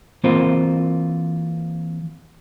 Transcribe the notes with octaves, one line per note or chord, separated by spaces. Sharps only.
E3 A#3 C4 F4 A#4 C5